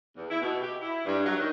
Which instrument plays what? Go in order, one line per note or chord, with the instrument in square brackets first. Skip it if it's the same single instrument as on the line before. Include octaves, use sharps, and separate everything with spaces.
[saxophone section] E2
E4
B2
G4
E4
G2
F#3
D#3